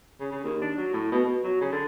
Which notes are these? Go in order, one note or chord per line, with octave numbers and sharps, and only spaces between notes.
C#3
C#3
D#2
D4
F#3
A2
B2
B2
F#3
C#3
D3